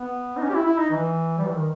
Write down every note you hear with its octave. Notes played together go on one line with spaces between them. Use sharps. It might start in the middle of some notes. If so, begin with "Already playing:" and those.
Already playing: B3
D#4
C#4
G4
E4
E4
D#4
E3
G3
E3
D#3